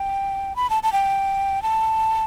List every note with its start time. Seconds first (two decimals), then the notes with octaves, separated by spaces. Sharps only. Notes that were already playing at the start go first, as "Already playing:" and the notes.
Already playing: G5
0.56 B5
0.70 A5
0.83 A5
0.93 G5
1.62 A5